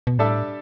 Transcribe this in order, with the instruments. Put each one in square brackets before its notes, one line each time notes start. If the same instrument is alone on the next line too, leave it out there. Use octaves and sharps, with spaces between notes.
[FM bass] B2
[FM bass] A2 [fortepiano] G3 D4 A4 E5